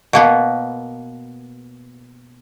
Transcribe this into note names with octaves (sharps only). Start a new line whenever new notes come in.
B2 A#3 B3